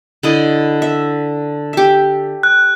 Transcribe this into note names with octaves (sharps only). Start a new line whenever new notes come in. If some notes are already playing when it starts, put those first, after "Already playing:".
D3 E4 D#5
E5
G4 E5
F#6